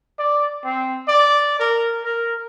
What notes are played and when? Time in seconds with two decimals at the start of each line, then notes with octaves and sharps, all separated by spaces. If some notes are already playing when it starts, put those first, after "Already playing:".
0.19 D5
0.65 C4
1.08 D5
1.60 A#4
2.04 A#4